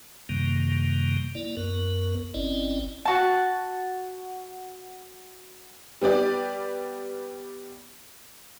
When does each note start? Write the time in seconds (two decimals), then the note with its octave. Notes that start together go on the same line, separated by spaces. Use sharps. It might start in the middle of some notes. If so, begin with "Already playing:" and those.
0.29 F#2 C3 D#3 G3 A#3
1.35 A#3 E4 D5
1.57 F#2 B3 A#4
2.34 G1 C4 C#4 E4 D5 D#5
3.05 F#4 A5
6.02 G3 B3 G4 D5